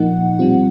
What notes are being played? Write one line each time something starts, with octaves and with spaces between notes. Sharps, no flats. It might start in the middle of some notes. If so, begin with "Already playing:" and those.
Already playing: A#2 F3 A#3 D#4 F#5
B2 G3 C4 F4